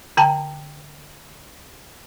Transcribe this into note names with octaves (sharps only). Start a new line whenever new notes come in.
D3 G5 A5 A#5